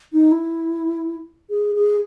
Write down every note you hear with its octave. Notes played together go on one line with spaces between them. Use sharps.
D#4
E4
G#4
G#4